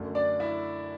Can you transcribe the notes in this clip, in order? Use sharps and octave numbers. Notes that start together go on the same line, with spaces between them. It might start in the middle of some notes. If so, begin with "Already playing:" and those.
Already playing: F#2 D3 A3
D4 D5
E4 E5